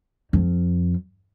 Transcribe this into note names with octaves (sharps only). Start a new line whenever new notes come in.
F2